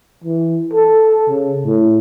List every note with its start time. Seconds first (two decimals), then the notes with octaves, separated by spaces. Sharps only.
0.24 E3
0.73 A4
1.29 C#3
1.66 A2